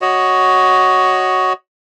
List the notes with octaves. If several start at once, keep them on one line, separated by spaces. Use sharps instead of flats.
F#4 C#5 D#5